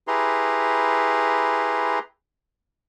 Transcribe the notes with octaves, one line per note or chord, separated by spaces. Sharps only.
E4 G4 G#4 B4 A#5 C6